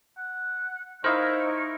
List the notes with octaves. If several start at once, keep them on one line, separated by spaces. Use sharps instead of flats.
F#5
D#4 E4 A#4 C5 D#5 F5 C#6